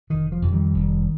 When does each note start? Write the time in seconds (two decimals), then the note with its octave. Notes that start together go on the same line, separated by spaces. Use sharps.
0.10 F1 D#3
0.32 F3
0.42 F2 C3
0.53 D#3 G3
0.74 F1